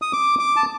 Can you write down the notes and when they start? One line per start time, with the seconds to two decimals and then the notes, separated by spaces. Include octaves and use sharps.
0.02 D#6
0.13 D6
0.39 D6
0.56 A5